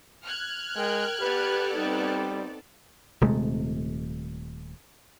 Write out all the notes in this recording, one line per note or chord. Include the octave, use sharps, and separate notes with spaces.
F6 F#6 G#6
G#3 A#4 G5
B3 G4 A4 B4 D5
G3 C4 D#4
D#1 C3 G#3 A3